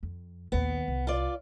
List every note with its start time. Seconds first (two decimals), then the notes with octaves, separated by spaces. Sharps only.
0.03 F2
0.52 A#1 D#2 B3
0.88 C2
1.07 F4 D5